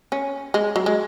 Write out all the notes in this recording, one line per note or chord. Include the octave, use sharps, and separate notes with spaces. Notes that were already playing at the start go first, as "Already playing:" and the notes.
C#4
G#3
F#3
G#3